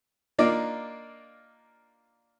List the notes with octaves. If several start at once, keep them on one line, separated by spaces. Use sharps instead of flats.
A#3 D4 D#4 F4 A#4 D5